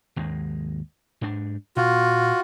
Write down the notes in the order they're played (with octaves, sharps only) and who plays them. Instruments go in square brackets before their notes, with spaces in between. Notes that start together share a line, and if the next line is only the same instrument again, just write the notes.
[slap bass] G#1 D#2 G#3
G#2 D4
[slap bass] A#2 [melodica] F4 F#4